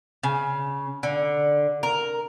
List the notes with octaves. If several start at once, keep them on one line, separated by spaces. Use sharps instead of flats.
C#3
D3
A#4